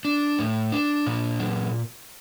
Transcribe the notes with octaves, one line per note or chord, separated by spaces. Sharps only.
D4
A2
D4
A#2
F#3